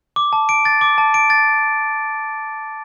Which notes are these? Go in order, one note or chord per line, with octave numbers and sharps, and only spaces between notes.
D6
A5
D7
A6
D6
A5
D7
A6